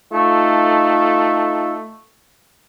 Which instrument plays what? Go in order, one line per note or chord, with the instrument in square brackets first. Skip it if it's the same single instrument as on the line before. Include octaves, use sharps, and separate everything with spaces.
[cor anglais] A3 [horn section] D#4 F4 A4